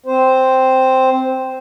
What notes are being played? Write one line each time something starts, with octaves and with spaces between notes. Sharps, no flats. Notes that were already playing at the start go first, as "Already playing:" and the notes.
C4 C5